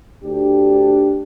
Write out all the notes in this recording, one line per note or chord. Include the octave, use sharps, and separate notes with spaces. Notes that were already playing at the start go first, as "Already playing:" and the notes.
D2 D4 G4